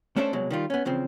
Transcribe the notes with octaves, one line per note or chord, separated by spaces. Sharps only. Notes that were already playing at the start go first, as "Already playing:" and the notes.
A3 C#4 D4 A4 C5 E5
C2 B2 F#3 G#3
D#3 G3 F4
B3 C#4
E2 C#3 F3 C4